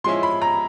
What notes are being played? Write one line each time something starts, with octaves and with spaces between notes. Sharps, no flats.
F3 G#3 C#4 E4 C6
B5
A#5